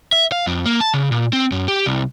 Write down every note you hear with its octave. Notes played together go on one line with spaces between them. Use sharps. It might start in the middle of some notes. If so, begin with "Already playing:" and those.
E5
F5
F2
A#3
A5
C#3
A#2
C4
F#2
G4
C2